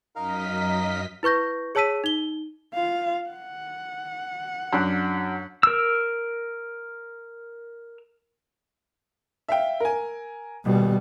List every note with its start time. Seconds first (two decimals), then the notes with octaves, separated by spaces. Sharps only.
0.16 F#2 D#4 A#4 D#5 F5 B6
1.23 E4 B4 C#6 G6 A#6
1.75 G#4 C#5 A5 E6 B6 D#7
2.04 D#4 G7
2.74 F4 F5
3.30 F#5
4.73 F#2 D4 F#6
5.63 A#4 E6
9.48 E5 F5 G5
9.80 A#4 G#5
10.65 D#1 B2 G3